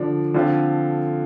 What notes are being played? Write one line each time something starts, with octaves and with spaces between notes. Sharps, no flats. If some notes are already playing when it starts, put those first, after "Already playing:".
Already playing: D3 F3 D4
D3 F3 C4 F4 A4